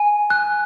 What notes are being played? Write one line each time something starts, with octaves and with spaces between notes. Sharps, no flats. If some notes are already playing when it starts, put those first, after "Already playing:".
Already playing: G#5
F#6